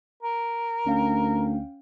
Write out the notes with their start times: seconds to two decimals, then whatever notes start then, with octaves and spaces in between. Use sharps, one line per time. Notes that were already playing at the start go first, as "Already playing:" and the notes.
0.23 A#4
0.86 D2 C#4 F5 G5